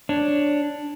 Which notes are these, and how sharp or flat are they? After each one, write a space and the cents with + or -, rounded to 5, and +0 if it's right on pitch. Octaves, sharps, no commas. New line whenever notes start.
D4 +0 C#5 +0